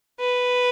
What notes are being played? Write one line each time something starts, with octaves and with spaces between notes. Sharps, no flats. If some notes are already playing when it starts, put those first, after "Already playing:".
B4